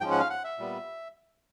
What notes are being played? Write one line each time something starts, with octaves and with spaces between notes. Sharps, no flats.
G#2 F3 G#3 C#4 G5
F#5
F5
F#5
E5
A#2 G3 B3